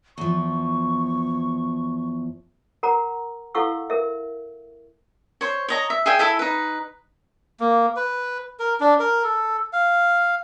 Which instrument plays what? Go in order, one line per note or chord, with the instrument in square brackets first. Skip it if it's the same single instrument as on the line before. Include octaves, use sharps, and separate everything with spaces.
[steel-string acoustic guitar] E2 F3 [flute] C#6
[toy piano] A#4 F#5 A#5
E4 A4 F5 F#5 C#6 E6
A#4 E5
[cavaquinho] C5 C#5
C#5 D#5 A#5
E5
G#4 E5 G5 G#5
E4 A4 E5 G#5
D#4 B4
[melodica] A#3
B4
A#4
D4
A#4
A4
F5